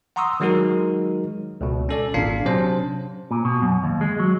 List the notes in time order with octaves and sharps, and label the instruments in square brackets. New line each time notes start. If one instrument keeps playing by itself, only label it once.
[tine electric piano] F#5 A#5 C6 C#6 D#6 E6
D#3 F#3 G#3 D#4 F#4 A#4
C#2 B2
C#4 A4 D5
G#1 A#2 D4 F5 C7
C3 F#3 C#4 D4 C5 A5
[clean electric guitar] A#2
B2
F#2
D#2
G#3
F#3